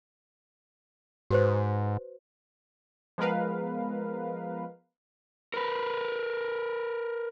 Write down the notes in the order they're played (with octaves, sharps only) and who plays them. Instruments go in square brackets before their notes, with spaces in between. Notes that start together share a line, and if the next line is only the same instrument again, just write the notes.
[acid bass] G#2 [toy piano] F#4 B4 C5
[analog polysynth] F3 G#3 B3 A#4 B4 F5
[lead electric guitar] A#4 B4